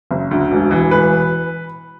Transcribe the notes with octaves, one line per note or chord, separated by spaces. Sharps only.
F#1
D2
E1
E3
E1 B4